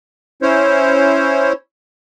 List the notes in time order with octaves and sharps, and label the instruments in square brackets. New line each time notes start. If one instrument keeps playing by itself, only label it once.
[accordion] C#4 E4 C5 C#5